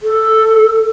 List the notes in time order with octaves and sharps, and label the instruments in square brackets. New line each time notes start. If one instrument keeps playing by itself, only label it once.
[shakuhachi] A4